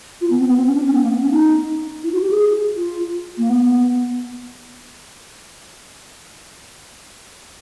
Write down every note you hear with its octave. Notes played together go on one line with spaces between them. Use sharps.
F4
B3
C4
B3
C4
C#4
D4
C#4
B3
A#3
B3
C#4
D#4
E4
F#4
G4
G#4
F4
A#3
B3